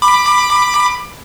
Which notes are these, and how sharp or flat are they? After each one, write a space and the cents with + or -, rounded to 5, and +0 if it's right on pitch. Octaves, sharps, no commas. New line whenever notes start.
B5 +0 D6 +20